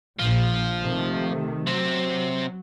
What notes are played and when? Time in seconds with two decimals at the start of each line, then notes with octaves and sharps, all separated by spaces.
0.19 A#1 A#2 F3
0.83 C3 D#3 A3
1.67 C3 F#3 C4